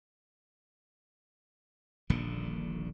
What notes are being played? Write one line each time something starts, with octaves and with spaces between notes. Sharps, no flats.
D#1 A#1 A#2 D3